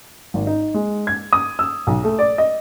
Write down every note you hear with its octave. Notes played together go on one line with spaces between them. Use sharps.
G#1
D#4
G#3
G#6
D#6
E6
B1
A3
D5
D#5